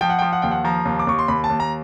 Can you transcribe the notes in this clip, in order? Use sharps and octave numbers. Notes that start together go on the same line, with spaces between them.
F3 G5
F#5
F3 G5
F#5
D#2 G5
F#5
F3 A#5
D#2
D6
D#2 C#6
C6
D#2 B5
A5
D#2
A#5